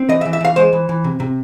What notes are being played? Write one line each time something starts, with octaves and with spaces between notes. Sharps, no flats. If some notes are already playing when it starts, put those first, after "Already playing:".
Already playing: C4
E3 D#5
E5
E3
E5
E3 F5
G#3 C5
E3
E3
C3
C3